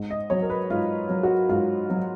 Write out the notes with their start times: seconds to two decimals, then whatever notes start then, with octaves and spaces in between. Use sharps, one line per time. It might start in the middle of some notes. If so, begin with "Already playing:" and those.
Already playing: G#2
0.10 D#5
0.30 F#3 C#5
0.42 A#4
0.50 B4
0.70 G#2 F4
1.09 F#3
1.23 F#4
1.49 G#2 F4
1.90 F#3